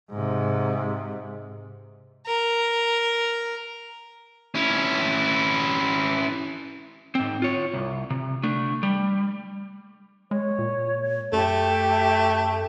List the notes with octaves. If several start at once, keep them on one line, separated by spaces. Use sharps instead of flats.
G#2 C3
A#4
C#4 E4
G#2 C4
F4 C#5
C2
C3
A3 D4
G3
G#3 C#5
A#2
F#2 A3 G4 E5 A5